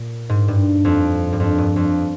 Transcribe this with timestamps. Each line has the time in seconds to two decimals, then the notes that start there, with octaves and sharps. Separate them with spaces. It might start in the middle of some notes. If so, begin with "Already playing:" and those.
Already playing: A#2
0.29 G#2
0.48 G2
0.85 F2
1.33 G2
1.40 F2
1.58 G2
1.76 F2